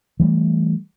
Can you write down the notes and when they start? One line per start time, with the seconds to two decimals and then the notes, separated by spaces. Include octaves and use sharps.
0.20 E3 G3 A3